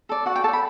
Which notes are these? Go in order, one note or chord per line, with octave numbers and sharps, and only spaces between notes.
A4 D5
F#4 F#5
G5
A4 D5 A5
B5